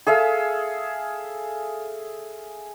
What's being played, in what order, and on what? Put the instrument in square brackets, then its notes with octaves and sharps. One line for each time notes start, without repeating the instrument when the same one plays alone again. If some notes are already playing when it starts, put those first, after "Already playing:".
[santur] G#4 A4 E5 F5